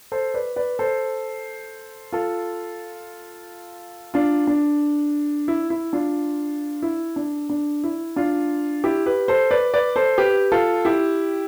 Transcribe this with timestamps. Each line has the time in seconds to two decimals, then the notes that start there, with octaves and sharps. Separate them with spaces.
0.12 A4 C5
0.34 B4 D5
0.56 B4 D5
0.79 A4 C5
2.12 F4 A4
4.14 D4 F4
4.47 D4
5.48 E4
5.70 E4
5.93 D4 F4
6.82 E4
7.16 D4
7.50 D4
7.84 E4
8.16 D4 F4
8.84 E4 G4
9.06 G4 B4
9.28 A4 C5
9.51 B4 D5
9.74 B4 D5
9.96 A4 C5
10.18 G4 B4
10.52 F4 A4
10.85 E4 G4